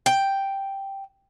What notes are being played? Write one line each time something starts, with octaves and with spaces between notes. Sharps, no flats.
G5